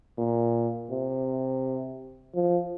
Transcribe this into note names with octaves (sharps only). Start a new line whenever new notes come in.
A#2
C3
F3